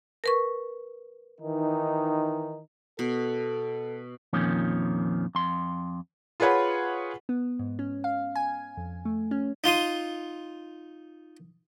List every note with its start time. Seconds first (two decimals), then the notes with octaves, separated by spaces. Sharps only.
0.24 A#4 B4 C#6
1.41 D#3 E3 D#4
2.99 B2 A4
4.33 F2 A#2 D#3 F3 C#4
5.35 F2 C6
6.40 F4 G#4 B4 C#5 F#5 B5
7.29 B3
7.59 G#2
7.79 C#4
8.04 F5
8.35 G#5
8.77 F2
9.05 A3
9.31 C#4
9.64 D#4 F4 C6 D#6